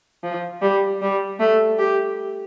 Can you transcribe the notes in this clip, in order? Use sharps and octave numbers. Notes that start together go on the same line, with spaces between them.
F3
G3
G3
A3
G4